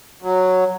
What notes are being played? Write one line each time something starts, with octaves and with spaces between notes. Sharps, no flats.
F#3